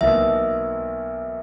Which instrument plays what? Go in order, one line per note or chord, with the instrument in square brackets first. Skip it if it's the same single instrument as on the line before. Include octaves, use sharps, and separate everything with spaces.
[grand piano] B1 B2 A#3 [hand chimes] E5